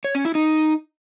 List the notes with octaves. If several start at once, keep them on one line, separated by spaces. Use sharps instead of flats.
C#5
C#4
E4
D#4